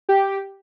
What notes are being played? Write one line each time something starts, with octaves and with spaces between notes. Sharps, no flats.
G4